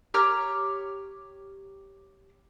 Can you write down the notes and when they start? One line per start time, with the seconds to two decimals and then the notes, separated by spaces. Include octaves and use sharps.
0.14 G4 C#5 A#5 F6